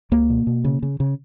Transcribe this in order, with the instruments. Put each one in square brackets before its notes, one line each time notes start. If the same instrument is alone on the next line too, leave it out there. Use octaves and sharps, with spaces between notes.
[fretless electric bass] C#2 A#3
B2
B2
C#3
C#3
C#3